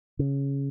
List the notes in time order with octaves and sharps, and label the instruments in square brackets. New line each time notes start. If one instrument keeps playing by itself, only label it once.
[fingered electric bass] C#3